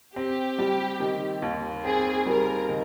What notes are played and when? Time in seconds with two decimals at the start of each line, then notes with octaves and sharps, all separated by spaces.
0.16 C4 G4
0.59 G3
1.00 D#3
1.42 D#2
1.84 C4 G#4
2.26 G3 A#4
2.69 D#3